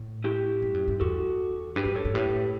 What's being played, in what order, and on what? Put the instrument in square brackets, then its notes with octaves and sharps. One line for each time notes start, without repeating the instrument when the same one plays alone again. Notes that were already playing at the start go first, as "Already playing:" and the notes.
Already playing: [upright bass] A2
[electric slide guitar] E4 G4
[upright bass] G2
F#2
G2
[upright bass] E2 [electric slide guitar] F#4 A4
[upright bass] G2 [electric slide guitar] G4 B4
[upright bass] A2
[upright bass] G2 [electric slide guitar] A4 C#5
[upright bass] G2
[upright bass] A2 [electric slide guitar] G4 B4